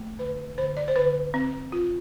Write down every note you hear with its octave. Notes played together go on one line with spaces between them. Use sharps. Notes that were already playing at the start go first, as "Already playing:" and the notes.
Already playing: A3
D3 B4
D3 C5
D5
C5
D3 B4
C4
F4